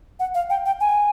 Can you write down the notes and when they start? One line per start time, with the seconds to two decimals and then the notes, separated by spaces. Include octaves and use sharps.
0.20 F#5
0.35 F5
0.50 G5
0.66 G5
0.81 G#5